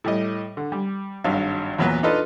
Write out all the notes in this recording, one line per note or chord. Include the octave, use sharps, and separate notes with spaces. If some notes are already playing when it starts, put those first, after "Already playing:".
A2 G3 D#5
D3
G3
G#1 G2 F#3 F5
E2 A#2 F#3 B3 B4
D4 D#4 F4 A4 B4 D#5